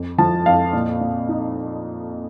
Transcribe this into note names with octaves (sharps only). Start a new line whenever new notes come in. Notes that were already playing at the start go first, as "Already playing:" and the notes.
Already playing: F2
F3 A5
F2 F5
A#2
A#2
D#4